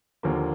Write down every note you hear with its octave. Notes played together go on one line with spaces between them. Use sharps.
D#2 D3 F3 A#3